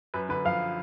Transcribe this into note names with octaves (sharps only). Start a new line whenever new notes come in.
F#2 B4
D3 B4
F3 F5